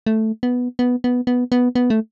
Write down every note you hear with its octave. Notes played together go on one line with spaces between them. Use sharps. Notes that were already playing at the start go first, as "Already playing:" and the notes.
A3
B3
B3
B3
B3
B3
B3
A3